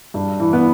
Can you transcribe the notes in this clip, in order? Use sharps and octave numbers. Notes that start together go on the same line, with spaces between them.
G2
E3
B3